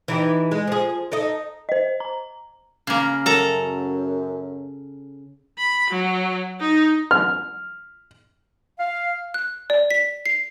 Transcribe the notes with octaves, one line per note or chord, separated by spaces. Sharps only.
E3 D#4 G4
G#3
F3 G#4
D#4 A4 D#5
C5 D#5
A#5
C#3 A#3
F#2 A4 A#5
B5
F#3
D#4
F6
F5
F#6
D5
B6
C7